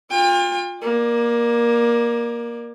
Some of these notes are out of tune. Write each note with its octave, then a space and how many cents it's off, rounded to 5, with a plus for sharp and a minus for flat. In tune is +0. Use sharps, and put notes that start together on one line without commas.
F4 +25 G5 +45
A#3 +15 D5 +25